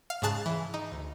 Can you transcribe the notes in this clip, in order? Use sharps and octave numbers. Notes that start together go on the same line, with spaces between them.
F5
G#2 C#3 G#4 A5 F#6 A6
E3
D#4
D2